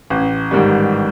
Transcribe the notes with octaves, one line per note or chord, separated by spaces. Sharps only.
A1
G#2 D#3 G3